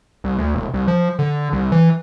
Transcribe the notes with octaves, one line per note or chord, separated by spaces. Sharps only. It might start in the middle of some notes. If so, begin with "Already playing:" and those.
C2
D2
E1
C2
F3
D3
C2
E3